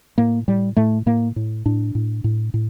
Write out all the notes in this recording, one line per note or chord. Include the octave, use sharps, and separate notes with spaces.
A2 A#3
A2 G3
A2 A3
A2 A#3
A2
A2 D4
A2
A2
A2